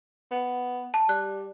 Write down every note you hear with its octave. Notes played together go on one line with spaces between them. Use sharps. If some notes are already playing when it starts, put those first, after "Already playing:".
B3
A5
G3 F#6